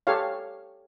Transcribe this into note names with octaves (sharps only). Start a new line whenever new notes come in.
G4 A4 C#5 F5